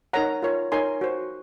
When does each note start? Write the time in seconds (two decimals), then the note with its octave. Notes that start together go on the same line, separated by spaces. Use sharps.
0.13 D#4 A#4 C#5 F#5 A#5
0.42 F4 A#4 C#5
0.72 D#4 A#4 C#5 G#5 C6
1.01 F#4 C5